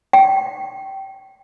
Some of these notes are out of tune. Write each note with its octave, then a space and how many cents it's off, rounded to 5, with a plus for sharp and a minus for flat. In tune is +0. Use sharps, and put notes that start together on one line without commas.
G5 -20